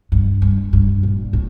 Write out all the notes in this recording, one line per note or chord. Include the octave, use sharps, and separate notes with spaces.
G2
G2
G2
A#2
A2